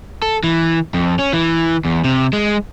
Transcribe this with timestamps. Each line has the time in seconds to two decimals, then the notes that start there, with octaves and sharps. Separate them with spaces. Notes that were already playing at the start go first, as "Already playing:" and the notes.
0.22 A4
0.44 E3
0.94 F2
1.19 C#4
1.33 E3
1.85 E2
2.04 C3
2.33 G#3